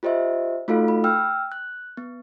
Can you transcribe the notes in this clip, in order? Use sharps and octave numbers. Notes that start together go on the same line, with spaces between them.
F4 G4 C5 D#5 E5
A3 D#4 F4 F#4 A4 F5
B5
G5 E6 F6
F#6
B3